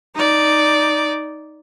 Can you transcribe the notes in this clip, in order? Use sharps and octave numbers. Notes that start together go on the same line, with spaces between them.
D#4 D5